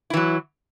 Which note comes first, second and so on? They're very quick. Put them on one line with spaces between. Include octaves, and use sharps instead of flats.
E4 E3 F#3